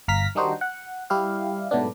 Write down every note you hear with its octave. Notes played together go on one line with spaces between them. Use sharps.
G1 F5 A#5 F6 A#6 B6
D#3 G3 D4 D#4 F#4 C5
F#5
G3 E4 G4 F5
G#2 B2 F#3 A3 B3 D4